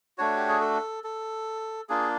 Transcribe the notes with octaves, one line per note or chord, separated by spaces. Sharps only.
A3 D4 F#4 C#5
G4
G#4
A4
A4
A#3 D4 F4 G#4